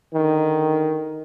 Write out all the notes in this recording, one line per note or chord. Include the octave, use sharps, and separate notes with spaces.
D3 D#3